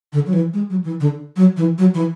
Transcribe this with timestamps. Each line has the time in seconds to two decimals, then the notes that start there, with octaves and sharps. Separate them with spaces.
0.13 D3
0.26 F#3
0.33 E3
0.54 G#3
0.70 F#3
0.84 E3
1.00 D3
1.36 F#3
1.57 E3
1.78 F#3
1.94 E3